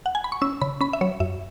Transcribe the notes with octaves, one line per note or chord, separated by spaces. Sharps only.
F#5
G#5
B5
C#6
C#4 E6
C#3 B5
C#4 B5
E5
F#3 C#5
F#2 E5